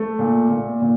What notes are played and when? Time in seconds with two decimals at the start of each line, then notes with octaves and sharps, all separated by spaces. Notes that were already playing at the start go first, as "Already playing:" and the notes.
Already playing: A3
0.19 A#2
0.50 A#2
0.82 A#2